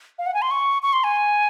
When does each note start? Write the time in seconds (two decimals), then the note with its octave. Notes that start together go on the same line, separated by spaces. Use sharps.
0.18 F5
0.26 F#5
0.34 G#5
0.42 C6
0.51 C#6
0.82 C#6
0.93 C6
1.04 G#5